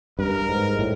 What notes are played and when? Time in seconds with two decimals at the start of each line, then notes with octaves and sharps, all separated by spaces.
0.19 G2 A#4
0.49 G#2
0.79 A2